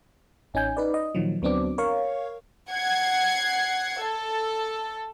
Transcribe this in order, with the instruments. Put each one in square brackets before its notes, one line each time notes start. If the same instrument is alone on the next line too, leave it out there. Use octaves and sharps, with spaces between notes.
[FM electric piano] A1 C#4 D#4 G#5 G6
D#4 B4 D5
D#5
A#2 D#3 F3 F#3
D2 F#3 B3 C4 D4 D6
A#4 C#5 F5 C#6
[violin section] F#5 G#6 C7
A4